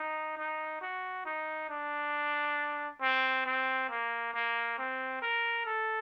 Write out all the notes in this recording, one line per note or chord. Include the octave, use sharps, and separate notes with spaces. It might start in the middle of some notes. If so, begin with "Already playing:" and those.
Already playing: D#4
D#4
F#4
D#4
D4
C4
C4
A#3
A#3
C4
A#4
A4